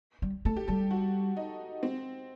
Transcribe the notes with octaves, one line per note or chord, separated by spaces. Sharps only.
G3
A3 A4
G4
G3 A4
F#4
D#4
C4